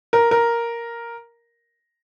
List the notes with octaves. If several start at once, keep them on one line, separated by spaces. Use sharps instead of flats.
A#4
A#4